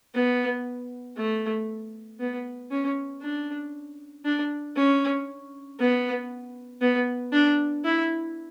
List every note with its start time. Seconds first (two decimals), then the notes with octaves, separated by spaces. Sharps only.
0.14 B3
1.17 A3
2.20 B3
2.71 C#4
3.22 D4
4.25 D4
4.76 C#4
5.79 B3
6.81 B3
7.33 D4
7.85 E4